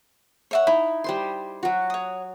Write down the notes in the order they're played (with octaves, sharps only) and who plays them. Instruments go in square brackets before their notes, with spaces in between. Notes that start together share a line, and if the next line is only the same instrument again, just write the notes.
[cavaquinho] C#5 E5 F#5
[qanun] D#4 [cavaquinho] E4
[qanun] G3 C5 C6
F#3 F#4
[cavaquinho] C#5 D#6